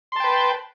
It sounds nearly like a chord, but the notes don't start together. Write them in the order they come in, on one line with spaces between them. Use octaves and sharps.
C6 A5 G5 B4